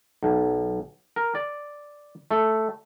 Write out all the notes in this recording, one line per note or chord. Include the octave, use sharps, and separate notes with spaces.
B1
A#4
D5
A3